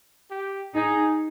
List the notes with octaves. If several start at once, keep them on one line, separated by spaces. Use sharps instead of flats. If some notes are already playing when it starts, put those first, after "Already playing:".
G4
D#4 G#4